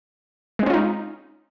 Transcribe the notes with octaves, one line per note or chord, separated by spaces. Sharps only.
G#3 C4 C#4 D#4 F4